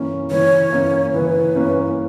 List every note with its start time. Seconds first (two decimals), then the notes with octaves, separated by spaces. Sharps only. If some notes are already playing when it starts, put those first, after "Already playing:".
Already playing: E3 A#3 C#4
0.31 E3 C#5
0.72 A#3 C#4
1.14 E3 B4
1.55 A#3 C#4